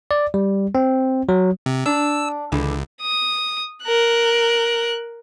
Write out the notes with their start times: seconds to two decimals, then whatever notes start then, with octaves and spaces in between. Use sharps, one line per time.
0.11 D5
0.34 G3
0.75 C4
1.29 F#3
1.66 C3
1.86 D4 E6
2.52 C#2 D3 E3
3.01 D#6
3.84 A#4 F#6